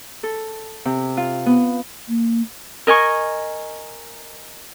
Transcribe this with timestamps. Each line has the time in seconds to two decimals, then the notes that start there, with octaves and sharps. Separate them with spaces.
0.23 A4
0.85 C3
1.17 F4
1.46 B3
2.09 A#3
2.87 A#4 D#5 G#5 C#6